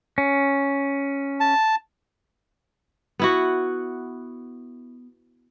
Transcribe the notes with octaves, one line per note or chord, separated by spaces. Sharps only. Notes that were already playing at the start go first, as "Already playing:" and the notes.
C#4
A5
B3 E4 F#4